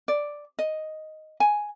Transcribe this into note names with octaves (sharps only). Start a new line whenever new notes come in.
D5
D#5
G#5